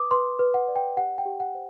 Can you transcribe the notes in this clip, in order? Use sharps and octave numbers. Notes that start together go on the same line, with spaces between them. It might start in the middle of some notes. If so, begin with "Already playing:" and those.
Already playing: B4 D6 D#6
B4 C6
B4
F#5
D5
G5
G4 F#5
G5
G4
F#5
C5